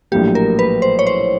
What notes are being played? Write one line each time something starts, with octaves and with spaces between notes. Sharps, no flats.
A#1 A2 F#3 A#3 G4
A#4
B4
C5
C#5
C5